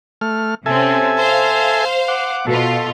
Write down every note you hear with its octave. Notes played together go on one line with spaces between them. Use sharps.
A3 F6
C3 C4 C#4 A4 E5 G#5
C5 F5
F#5 D6
B2 F4 A4